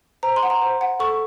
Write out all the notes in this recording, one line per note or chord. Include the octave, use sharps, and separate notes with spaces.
C5 A#5
C6
F#5
A#5
C5
F#5
A4 C#6